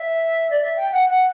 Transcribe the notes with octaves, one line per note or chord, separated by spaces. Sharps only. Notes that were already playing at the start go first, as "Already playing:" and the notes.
Already playing: E5
D5
E5
G5
F#5
F#5